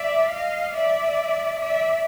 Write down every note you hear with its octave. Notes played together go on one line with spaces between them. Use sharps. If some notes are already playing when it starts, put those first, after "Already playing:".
Already playing: D5 E5
D#5 F5
D5 E5
D5 E5